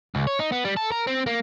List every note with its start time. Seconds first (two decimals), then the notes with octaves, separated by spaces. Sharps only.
0.15 C#2
0.27 C#5
0.39 D#4
0.52 B3
0.65 G3
0.77 A4
0.92 A#4
1.07 C4
1.26 A#3